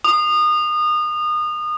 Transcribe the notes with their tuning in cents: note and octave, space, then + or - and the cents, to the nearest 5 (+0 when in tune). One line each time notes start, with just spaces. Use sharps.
D#6 -30